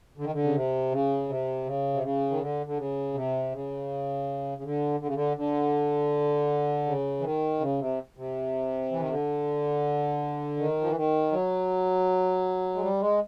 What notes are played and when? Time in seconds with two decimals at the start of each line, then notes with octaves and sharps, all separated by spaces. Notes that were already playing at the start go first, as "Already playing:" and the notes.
0.18 D3
0.24 D#3
0.32 D3
0.44 C#3
0.54 C3
0.92 C#3
1.29 C3
1.66 C#3
1.94 C3
2.03 C#3
2.30 D#3
2.40 D3
2.66 D3
2.77 C#3
3.14 C3
3.52 C#3
4.58 C#3
4.64 D3
5.00 D3
5.07 C#3
5.15 D3
5.37 D3
6.86 C#3
7.20 E3
7.24 D#3
7.60 C#3
7.80 C3
8.17 C3
8.92 E3
9.00 D#3
9.10 D3
10.58 D#3
10.81 F3
10.89 E3
10.96 D#3
11.32 F#3
12.75 G#3
12.81 G3
13.00 G#3